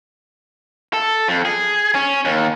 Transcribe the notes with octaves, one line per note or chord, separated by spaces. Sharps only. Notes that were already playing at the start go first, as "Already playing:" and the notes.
A4
F2
G#4
C#4
D#2